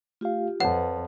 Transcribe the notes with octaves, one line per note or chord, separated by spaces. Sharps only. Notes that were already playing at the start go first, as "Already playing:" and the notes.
A3 F4 G4 F5
F2 B4 C#5 F#5 A5